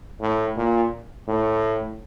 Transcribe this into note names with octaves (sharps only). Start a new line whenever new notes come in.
A2
A#2
A2